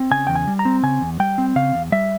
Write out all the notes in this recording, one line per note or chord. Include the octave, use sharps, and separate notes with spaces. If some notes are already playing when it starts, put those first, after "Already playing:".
Already playing: C4
C#3 G#5
E2 G5
G#5
G3
A#5
C4
C#3 G#5
E2
G3 G5
C4
C#3 F5
E2
G3 E5